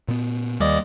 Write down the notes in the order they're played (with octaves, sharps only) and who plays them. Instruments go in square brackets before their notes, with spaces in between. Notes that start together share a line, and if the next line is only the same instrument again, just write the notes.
[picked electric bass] A#2 B3
[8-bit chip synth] D#2 D5 D#5 [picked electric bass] G3 A#3